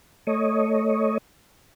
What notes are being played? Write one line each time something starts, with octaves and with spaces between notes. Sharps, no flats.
A3 C#5 D#5